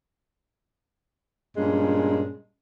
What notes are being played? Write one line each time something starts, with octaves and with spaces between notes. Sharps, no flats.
G2 A#2 G#3 C#4